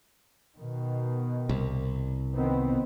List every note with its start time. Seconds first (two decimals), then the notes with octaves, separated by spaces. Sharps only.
0.55 B2 D#3
1.49 C2
2.34 D#3 B3 C4